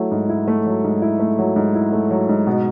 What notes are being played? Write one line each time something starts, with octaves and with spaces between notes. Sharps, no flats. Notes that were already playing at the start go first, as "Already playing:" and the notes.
Already playing: F#3 A3 E4
G#2
E4
A3
F#3
G#2
E4
A3
F#3
G#2
E4
A3
F#3
G#2
B2